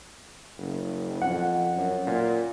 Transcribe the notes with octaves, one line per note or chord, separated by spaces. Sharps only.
F#1
F2 F#5
F#2
A#2